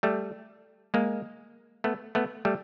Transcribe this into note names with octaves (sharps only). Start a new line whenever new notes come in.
G3 A3
G#3 A#3
A3 B3
A3 B3
G3 A3